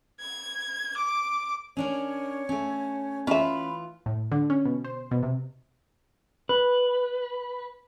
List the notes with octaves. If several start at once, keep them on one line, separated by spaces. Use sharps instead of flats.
G#6
D6
C#4 D4 A#4 C#5
A3 C#4
E3 C#4 F4 E5 B5
A2
D3
C#4
B2
C5
B2
C3
B4